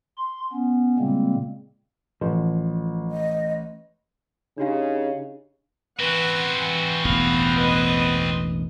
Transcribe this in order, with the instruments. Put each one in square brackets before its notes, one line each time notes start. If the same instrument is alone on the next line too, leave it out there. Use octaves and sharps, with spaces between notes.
[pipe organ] C6
B3 C#4
A#2 C#3 G3 G#3 A#3 C4
[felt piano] A1 [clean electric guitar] F3
[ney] D#5
[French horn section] C#3 D#4 [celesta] D4 G4 F5
[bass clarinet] E3 [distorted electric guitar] C4 F#4 [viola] B4 F#5
[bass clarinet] E3
[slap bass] E1 A1 [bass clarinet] B3 [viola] F5
[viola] B4 D#5